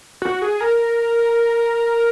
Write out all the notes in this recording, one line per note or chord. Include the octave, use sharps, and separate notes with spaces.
F#4
G#4
A#4